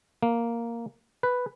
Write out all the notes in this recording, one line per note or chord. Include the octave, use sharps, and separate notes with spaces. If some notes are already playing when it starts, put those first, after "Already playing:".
A#3
B4